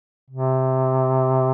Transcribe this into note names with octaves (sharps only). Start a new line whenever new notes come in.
C3